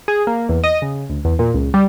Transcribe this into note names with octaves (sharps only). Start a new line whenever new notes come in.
G#4
A#3
E2
D#5
C#3
D2
E2
A#2
C#2
G3